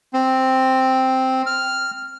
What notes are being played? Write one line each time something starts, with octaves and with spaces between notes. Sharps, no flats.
C4
F6